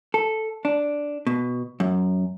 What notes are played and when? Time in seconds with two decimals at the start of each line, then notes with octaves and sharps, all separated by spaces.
0.14 A4
0.65 D4
1.27 B2
1.80 F#2